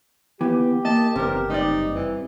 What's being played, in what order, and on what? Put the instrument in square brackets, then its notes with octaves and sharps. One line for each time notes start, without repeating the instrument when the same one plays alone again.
[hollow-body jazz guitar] D#2 E3 [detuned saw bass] B3 [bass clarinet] G4
[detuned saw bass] A#3 [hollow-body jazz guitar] D#5 [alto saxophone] A5
[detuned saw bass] F#1 [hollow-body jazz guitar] E2 C3 [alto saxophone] A#4
[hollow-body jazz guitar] G2 C3 D5 [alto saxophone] D#4
[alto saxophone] E3